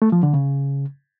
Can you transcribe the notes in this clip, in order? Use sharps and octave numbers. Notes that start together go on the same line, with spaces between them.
A3
F3
D3
C#3